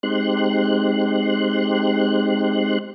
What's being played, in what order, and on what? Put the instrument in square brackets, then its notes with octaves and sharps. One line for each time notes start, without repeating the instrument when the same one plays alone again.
[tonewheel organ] G#3 C4 D#4 G4 C6 F#6